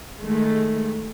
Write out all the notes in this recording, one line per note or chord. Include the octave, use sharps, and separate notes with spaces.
D#3 G#3 A3